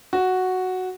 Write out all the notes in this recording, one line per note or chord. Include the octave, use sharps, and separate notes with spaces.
F#4